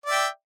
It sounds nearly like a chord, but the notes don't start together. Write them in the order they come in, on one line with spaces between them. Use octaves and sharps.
D5 E5 G5